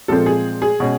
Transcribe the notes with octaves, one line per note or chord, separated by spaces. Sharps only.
A#2 F3 G#3 C4 A4
G#4
G#4
B2 G#3 C#4